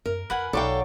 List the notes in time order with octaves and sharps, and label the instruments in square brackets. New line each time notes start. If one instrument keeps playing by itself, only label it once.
[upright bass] F#2 [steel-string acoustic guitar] A#4
[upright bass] F2 F4 [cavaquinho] B4 F#5 G#5
[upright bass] B1 [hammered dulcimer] F#3 D5 C#6 [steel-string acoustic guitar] A4 F5 G5